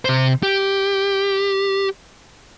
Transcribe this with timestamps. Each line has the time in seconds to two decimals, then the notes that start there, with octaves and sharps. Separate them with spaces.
0.05 C3 C5
0.43 G4